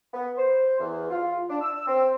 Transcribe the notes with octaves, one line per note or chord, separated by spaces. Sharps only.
B3
C5
E2
F4
D4
E6
C4